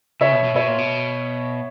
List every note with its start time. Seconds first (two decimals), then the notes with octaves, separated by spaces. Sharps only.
0.21 C#3 C#5 E5
0.32 B2
0.44 B2
0.55 B2 C#5 E5
0.68 A#2
0.78 B2